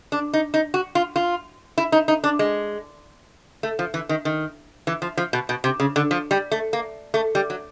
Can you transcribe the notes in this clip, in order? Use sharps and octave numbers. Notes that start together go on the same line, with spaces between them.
D4
D#4
D#4
F#4
F4
F4
E4
D#4
D#4
D4
G#3
A3
F3
E3
D#3
D#3
E3
F3
F3
B2
B2
C3
C#3
D3
F3
G3
A3
A#3
A3
G3
F#3